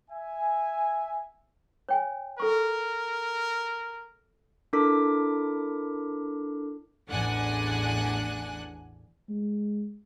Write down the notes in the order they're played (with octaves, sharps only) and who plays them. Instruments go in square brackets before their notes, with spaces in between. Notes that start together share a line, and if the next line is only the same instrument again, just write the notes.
[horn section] E5 G#5
[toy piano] C#5 G5 G#5
[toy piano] A4 C#6 [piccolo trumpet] A#4
[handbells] D4 E4 A4 A#4 D6 B6
[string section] A1 E2 D4 F#5 G#5 F#6
[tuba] G#3